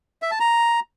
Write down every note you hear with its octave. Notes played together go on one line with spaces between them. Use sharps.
E5
A5
A#5